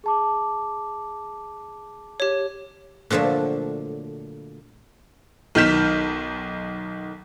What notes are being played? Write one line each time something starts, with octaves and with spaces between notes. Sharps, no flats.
G#4 A5 D6
G4 C#5
A#2 D3 F3 F#3 A3
B1 D#3 F6 G6 B6 E7